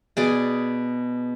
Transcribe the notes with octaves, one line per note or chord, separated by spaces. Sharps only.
B2 G#4 D5